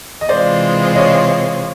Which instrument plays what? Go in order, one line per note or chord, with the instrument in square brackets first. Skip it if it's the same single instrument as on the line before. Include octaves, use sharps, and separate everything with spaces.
[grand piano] D#5
[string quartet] C3 E3 G#3 C4 F4 [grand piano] C5 D5
[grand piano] C#5 D#5